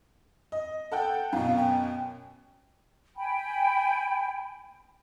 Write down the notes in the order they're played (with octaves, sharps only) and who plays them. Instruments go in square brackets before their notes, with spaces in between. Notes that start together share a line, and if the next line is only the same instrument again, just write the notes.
[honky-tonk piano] D#5
A4 F#5 G5
[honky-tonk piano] F#2 B2 [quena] F5
[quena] G5
[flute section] G5 G#5 B5